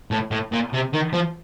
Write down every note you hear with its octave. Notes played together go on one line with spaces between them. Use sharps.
A2
A2
A#2
C3
D#3
F3